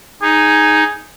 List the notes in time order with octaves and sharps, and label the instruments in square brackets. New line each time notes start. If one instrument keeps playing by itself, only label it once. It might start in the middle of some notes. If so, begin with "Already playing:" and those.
[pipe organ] D#4 [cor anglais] G#4